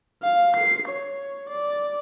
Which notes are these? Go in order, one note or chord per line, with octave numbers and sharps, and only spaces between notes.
F5
C7
C#5
D5